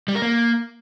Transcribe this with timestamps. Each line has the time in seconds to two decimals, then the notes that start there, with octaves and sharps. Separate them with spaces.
0.08 G3
0.15 A#4
0.22 A#3